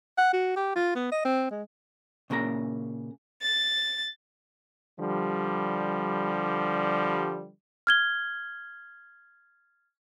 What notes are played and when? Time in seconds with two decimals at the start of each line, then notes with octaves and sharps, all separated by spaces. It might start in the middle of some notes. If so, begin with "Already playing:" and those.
0.18 F#5
0.33 F#4
0.57 G4
0.76 F4
0.95 B3
1.12 D#5
1.25 C4
1.51 G#3
2.30 A#2 C#3 A#3 C5 A#5
3.42 A6
5.00 D3 F3 G3
7.87 F6 G#6 G7